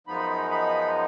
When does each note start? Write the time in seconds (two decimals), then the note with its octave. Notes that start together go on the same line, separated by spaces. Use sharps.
0.07 F#2 F3 G#3 B3 D#4 B5
0.51 B5